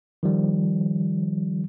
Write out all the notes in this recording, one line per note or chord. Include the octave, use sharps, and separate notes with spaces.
D#3 F3 G3